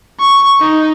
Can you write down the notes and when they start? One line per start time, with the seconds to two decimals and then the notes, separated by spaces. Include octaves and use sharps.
0.20 C#6
0.61 D#4